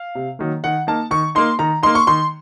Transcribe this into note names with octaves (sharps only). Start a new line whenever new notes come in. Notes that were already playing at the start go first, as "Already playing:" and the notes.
Already playing: F5
C3
D#3 F#3 A#3
D#3 F#5
A#3 D#4 A5
D#3 C#6
A#3 D#4 C6
D#3 A#5
A#3 D#4 C6
C#6
D#3 C6